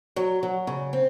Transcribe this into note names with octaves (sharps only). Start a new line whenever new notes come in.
F#3
F#3
C#3
C4